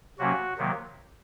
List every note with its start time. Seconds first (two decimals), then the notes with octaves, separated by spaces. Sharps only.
0.19 C3 F#3 A#3 C#4 F#4
0.57 C3 D#3 F#3 A#3